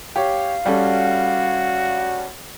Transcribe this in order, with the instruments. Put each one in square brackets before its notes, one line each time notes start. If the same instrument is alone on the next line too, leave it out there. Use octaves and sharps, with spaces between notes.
[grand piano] G4 C#5 [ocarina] F5
[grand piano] G3 C#4 A4 [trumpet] F#4